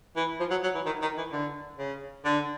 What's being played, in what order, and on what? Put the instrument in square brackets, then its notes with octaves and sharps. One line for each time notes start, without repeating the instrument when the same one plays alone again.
[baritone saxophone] E3
F3
F#3
F#3
E3
D#3
D#3
E3
D3
C#3
D3